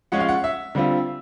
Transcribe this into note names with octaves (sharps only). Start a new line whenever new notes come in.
F3 G#3 C#4 F4 F#5
F5
F#5
E5
D3 G3 C4 F4